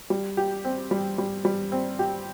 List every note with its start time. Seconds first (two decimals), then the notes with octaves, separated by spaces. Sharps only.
0.10 G3
0.37 G4
0.65 C4
0.91 G3
1.18 G3
1.45 G3
1.72 C4
1.99 G4